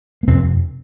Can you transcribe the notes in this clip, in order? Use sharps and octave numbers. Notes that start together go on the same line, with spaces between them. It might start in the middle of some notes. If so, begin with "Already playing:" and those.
A#3
F2 C3 C4